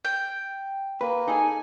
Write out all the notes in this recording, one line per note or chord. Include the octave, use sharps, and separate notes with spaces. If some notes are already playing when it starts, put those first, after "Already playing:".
G5
A#3 B4
D#4 G#4 A4 G#5